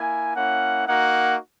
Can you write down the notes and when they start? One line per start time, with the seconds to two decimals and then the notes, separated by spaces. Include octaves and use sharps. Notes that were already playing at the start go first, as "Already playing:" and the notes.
Already playing: A#3 E4 G#5
0.35 A#3 C#4 E4 F#5
0.87 A#3 D#4 F#4 F#5